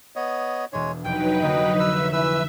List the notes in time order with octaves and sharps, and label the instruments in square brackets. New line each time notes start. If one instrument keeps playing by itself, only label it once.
[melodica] B3 C#5 D#5
[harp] E1 D4 [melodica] G#3 C#5
[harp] F1 G6 D7 [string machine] F#3 D#4 B4 [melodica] G5
[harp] D3 F3 A#3 [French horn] D#5
[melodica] B4 E6 [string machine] E5
[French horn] E3 [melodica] B4 E6